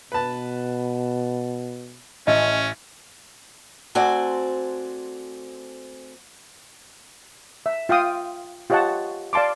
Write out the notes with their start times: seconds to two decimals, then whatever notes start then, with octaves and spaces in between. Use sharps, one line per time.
0.12 B2 B4 A5
2.27 A1 C#4 D#5
3.95 A3 C4 F#4 C5 D5 G#5
7.66 E5
7.89 F4 F5 G5 D#6
8.70 F4 G4 C#5 D#5 F#5 A5
9.33 D5 F5 A5 C6 D6